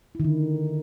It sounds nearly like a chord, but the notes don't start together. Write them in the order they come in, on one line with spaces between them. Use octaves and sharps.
E4 D#3 D3